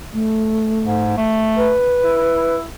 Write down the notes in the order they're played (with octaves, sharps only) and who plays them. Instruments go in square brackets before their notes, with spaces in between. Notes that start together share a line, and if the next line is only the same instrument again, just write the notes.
[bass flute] A3
[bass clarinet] G#2
A3
[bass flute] B4
[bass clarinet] E4